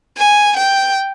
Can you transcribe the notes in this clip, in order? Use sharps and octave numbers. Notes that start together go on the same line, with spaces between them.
G#5
G5